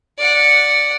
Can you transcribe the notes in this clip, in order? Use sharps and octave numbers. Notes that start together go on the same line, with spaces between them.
D5 F#5